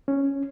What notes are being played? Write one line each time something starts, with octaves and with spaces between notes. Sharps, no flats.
C#4